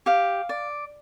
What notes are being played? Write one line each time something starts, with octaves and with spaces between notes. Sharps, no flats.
G4 F5
D5